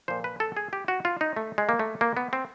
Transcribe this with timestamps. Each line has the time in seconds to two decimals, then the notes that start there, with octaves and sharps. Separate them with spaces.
0.08 A#2 F3 C5
0.24 B4
0.40 A4
0.57 G#4
0.73 G4
0.88 F#4
1.05 F4
1.21 D#4
1.36 A3
1.58 G#3
1.69 A#3
1.79 A3
2.01 A#3
2.17 B3
2.33 C4